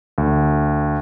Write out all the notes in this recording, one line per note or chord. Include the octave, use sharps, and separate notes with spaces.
D2